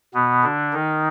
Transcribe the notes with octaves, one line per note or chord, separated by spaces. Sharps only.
B2 B3
D3 D4
D#3 D#4